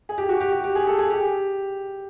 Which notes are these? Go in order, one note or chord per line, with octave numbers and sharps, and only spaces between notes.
G#4
G4
F#4
G4
G4
G4
G#4
A4
G#4
G4